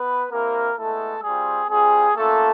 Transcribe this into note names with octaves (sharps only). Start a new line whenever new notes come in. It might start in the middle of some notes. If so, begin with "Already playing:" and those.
Already playing: B3 B4
A#3 C4 E4 G4 A#4
G#3 A3 B3 E4 A4
G3 C4 F4 G#4
G3 C4 F4 G#4
A3 A#3 C#4 F4 A4